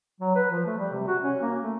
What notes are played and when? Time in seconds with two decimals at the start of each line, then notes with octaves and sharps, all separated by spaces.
0.20 F#3
0.35 B4
0.51 F3
0.66 A3
0.78 G3
0.93 C3
1.07 F#4
1.22 C#4
1.42 A#3
1.62 A3